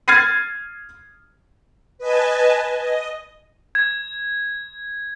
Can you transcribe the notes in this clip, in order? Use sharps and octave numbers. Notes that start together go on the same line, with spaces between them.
F6 G#6 A6 C7 D#7
B4 D#5 G#5 A5
D#5
G#6